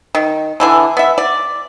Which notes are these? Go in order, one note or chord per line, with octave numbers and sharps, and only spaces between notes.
D#3
D3 E3 G#4
B3 E5
D5